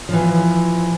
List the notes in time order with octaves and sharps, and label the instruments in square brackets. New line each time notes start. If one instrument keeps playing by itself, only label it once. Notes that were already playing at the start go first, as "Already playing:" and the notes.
[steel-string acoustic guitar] E3 F3